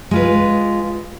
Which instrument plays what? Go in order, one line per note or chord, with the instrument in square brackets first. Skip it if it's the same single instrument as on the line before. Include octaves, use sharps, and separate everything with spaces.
[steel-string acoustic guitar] G#3 F4 B4